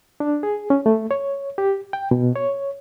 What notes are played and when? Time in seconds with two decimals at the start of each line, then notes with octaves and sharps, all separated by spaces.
0.20 D4
0.43 G#4
0.70 C#4
0.86 A3
1.11 C#5
1.58 G4
1.93 G5
2.11 B2
2.36 C#5